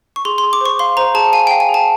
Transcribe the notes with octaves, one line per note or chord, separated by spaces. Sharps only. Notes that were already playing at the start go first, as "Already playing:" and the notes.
C#6
G#4 C6
C6
G#4
D6
C5 C#6
F5 C6
C5 A#5
G#4 A5
F5 G#5
F5 G5
G#5
G#4
A5